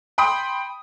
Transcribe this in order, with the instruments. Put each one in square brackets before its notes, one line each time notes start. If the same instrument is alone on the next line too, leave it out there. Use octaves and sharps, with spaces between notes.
[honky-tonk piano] G5 B5 C6 D#6